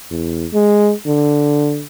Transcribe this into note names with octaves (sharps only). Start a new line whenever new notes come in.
E2
G#3
D3